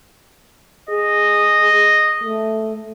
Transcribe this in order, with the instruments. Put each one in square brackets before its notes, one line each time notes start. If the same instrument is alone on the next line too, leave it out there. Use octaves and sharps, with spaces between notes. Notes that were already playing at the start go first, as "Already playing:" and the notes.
[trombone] G#4 [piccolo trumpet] D#5
[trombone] A3